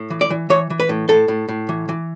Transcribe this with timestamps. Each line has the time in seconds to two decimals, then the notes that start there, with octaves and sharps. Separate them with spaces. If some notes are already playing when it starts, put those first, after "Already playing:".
Already playing: A2
0.10 E3
0.21 D5
0.30 E3
0.50 E3 C#5
0.70 E3
0.80 B4
0.89 A2
1.09 A2 A4
1.28 A2
1.49 A2
1.69 E3
1.89 E3